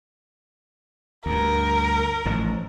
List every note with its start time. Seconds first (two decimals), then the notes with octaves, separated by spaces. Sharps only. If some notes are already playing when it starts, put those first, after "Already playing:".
1.26 D2 G2 A#4
2.26 A1 G#2 F3